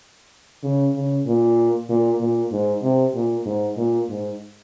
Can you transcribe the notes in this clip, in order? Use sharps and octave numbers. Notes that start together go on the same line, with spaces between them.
C#3
C#3
A#2
A#2
A#2
G#2
C3
A#2
G#2
A#2
G#2